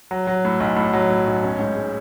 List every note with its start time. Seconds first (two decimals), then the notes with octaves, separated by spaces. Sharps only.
0.11 F#3
0.27 F#3
0.45 A2
0.60 B1
0.77 A2
0.93 F#3
1.10 A2
1.27 B1
1.43 C#4
1.59 G#2
1.76 G#3